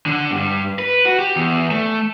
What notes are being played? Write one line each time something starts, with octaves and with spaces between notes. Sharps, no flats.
D3
G2
B4
F#4
G4
E2
A3